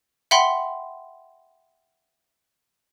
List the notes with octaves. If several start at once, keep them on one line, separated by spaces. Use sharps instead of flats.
E5 F#5 G5 B5 C6